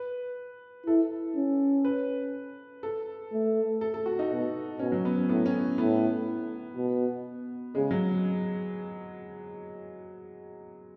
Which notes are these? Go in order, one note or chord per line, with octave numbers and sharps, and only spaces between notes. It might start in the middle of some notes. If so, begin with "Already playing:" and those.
Already playing: B4
E4 A4
C#4
B4
A4
A3
A4
A4
F#4
D#4
B2
B2 C#4
F#3
B3
C#4
A2 B3
C#4
A2 B3
B2
C#3 G#3
F#3